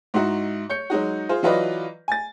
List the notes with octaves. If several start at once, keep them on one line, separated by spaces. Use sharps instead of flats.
G#2 D#4 E4 F#4
C#5 G6 C#7
F#3 G#3 D#4 F#4
F4 G#4 C5
E3 F#3 F4 B4 D5 D#5
G#5 A6